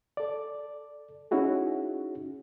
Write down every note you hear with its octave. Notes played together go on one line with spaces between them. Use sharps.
A4 D5
C#4 D#4 E4 F#4 G#4